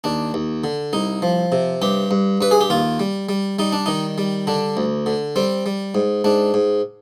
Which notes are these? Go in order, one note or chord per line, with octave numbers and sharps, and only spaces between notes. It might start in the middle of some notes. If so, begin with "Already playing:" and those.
D#2 D4
D#2
D3
C2 D#4
F3
C3
G2 G4
G2
G2 B4
G#4
G4
D#2 F4
G3
G3
G3 D#4
D4
D#3 D#4
G3
D3 D4
D2
D3
G3 C4
G3
G#2
G#2 D4
G#2